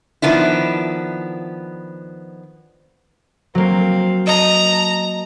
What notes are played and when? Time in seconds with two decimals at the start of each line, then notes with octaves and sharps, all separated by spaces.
0.22 D#3 F3 B3 D4 E4
3.55 F#3 A#3 C4 F5
4.27 D#5 A5 A#5